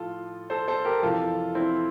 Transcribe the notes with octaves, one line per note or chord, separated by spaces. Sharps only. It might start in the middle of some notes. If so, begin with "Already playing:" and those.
Already playing: A2 F3 F4 A4
A4 C5
A4 C5
G4 A#4
F2 C3 E3 F4 A4
C4 E4